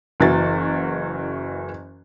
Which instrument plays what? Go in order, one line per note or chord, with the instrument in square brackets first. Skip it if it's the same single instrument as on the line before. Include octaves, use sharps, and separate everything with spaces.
[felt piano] F#1 E3 F#4 A6